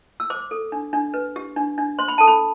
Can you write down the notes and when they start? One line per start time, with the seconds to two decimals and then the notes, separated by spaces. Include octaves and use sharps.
0.20 E6
0.30 C5 D6
0.51 A4
0.72 D4
0.93 D4
1.14 B4
1.36 G4
1.56 D4
1.78 D4
1.99 C5 C6
2.08 B5
2.18 A4 A5
2.28 B5